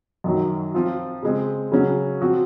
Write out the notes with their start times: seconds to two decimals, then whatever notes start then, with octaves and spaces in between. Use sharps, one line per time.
0.24 F#2 D#3 F#3
0.74 F3 C4 F4
1.23 C#3 G#3 C4
1.72 C#3 F#3 C#4 F#4
2.21 F3 C4 F#4